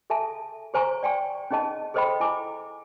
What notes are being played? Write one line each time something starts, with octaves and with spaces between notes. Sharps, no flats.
G#4 A4 E5 G#5 A5
G#4 C5 G#5 A#5 C#6
D5 G5 G#5 C#6
C#4 D#4 G#4 D#5 A5
G#4 A4 C5 D#5 G5 B5
E4 G#5 D6